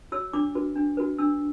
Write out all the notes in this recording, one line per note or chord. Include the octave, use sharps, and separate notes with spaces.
F#4 C#5 E6
D4 D6
F#4 B4
D4
F#4 B4
D4 E6